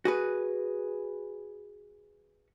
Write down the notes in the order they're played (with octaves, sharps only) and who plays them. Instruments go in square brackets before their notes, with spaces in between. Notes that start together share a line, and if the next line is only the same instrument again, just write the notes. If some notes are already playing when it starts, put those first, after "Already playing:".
[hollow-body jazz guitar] F#4 G#4 B4